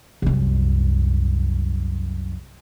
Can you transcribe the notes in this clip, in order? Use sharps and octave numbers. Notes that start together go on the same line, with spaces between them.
C2 F#2